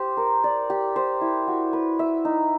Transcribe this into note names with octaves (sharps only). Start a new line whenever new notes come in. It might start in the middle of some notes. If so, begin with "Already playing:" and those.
Already playing: G4 C5
A#4
D5
G4
C5
E4
F#4
B4
E5
D#4